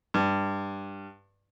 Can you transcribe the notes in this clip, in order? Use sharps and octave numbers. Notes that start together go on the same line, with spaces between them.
G2